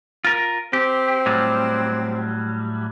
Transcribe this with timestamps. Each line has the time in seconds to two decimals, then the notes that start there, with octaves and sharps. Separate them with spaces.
0.25 F4 A#4
0.73 C4 G4
1.26 A2 F#3 G3